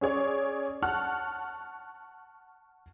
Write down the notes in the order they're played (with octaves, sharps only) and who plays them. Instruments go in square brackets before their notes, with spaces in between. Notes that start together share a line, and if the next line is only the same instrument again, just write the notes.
[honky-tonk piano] C#4 G#4 C#5 D5
F#5 A5 C#6 F6 F#6